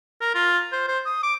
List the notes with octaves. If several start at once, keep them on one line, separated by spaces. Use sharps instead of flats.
A#4
F4
C5
C5
D#6
D6